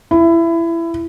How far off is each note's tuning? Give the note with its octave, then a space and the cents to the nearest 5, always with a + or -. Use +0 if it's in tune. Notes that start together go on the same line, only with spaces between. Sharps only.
E4 +20